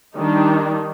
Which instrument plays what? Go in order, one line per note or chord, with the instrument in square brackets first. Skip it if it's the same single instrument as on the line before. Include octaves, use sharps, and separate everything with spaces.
[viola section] D#3 G3 D4 D#4